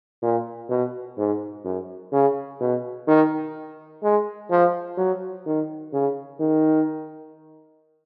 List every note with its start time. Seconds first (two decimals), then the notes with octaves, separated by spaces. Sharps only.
0.22 A#2
0.69 B2
1.18 G#2
1.64 F#2
2.12 C#3
2.60 B2
3.07 D#3
4.03 G#3
4.50 F3
4.97 F#3
5.46 D#3
5.93 C#3
6.40 D#3